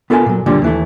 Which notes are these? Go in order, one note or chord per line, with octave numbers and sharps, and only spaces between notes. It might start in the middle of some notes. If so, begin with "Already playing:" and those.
B3 F4 A4 A#4 E5 G#5
A#2 F#3
C#2 A#2 D3 F3 G3
D#2 E3 A3